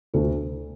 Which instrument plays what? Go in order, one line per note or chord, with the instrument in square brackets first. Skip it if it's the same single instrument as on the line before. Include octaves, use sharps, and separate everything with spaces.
[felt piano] D2 A4